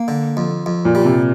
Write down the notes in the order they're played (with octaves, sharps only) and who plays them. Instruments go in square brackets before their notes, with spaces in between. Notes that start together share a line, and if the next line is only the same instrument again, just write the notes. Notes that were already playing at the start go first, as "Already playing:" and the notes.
Already playing: [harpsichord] A#3
D3
F2
F2
[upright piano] A#2
[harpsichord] G3
[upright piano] C3